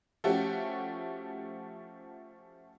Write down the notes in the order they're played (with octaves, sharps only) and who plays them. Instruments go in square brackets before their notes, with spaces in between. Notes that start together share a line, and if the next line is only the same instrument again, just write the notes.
[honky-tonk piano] F3 A3 C#4 F#4 G4